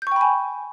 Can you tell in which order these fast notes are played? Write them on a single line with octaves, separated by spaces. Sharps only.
G6 C#6 G5 B5 G#5